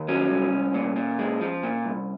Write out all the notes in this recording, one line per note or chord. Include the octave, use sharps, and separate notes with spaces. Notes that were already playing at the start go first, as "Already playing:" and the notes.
Already playing: D#2
F#3 C#4
C2
C2
A#2
A#2
G#3
F3
A#2
C2